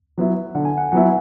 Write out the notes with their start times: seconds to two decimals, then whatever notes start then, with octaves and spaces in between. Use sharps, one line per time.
0.18 F#3 B3 E4
0.55 D3 F#5
0.65 G#5
0.78 F#5
0.92 F#3 B3 E4 F#5